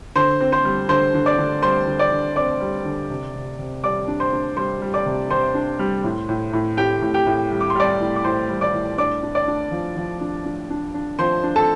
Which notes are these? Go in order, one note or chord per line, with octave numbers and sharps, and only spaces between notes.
D3 C5 C6
C4
C5 C6
G3
D3 C5 C6
D3
D5 D6
D3
G3 C5 C6
D3
D5 D6
D3
C4 D5 D6
G3
D3
C3
C3
C3
G3 D5 D6
D4
C5 C6
D4
G3 C5 C6
G3
D5 D6
C3
C3 C5 C6
D4
G3
A2
A2
A2
A2 G4 G5
A2
G4 G5
A2
G3
D6
C6
G3 D5 D6
A2
D6
A2 C5 C6
G3
D5 D6
A2
D4 D5 D6
D4
D5 D6
D4
F3
F3
D4
D4
D4
D4
F3 C5 C6
D4
A4 A5